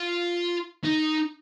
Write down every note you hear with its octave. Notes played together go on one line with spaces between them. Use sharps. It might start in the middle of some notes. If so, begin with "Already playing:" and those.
Already playing: F4
D#4